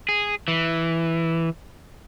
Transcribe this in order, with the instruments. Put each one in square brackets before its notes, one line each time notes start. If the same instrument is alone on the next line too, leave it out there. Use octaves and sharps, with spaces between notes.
[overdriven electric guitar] G#4
E3